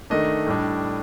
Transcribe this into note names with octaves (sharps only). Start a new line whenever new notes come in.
D#3 A3 D4 D#5
A2 G3 D4